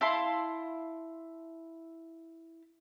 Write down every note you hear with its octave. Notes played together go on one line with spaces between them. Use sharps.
E4 F5 A5 C6